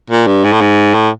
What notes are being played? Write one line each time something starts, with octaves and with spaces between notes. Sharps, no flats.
A#2
G2
G#2
A2
G#2
A2